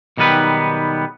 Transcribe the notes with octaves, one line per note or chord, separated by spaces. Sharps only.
B1 D#3 G3 B3 B4